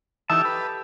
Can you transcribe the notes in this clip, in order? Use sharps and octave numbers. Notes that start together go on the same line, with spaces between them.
E3 D#4 G4 A4 E5 A5
B4